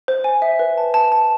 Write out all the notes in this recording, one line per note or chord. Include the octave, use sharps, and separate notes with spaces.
C5
G#5
E5
B4
A5
A5
A5